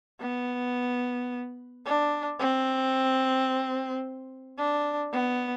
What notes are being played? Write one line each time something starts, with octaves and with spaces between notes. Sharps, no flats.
B3
D4
C4
D4
B3